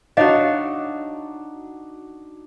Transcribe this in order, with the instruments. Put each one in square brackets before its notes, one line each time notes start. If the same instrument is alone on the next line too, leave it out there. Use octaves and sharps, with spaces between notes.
[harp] D4 D#4 F#4 [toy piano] C#5 D#5 F5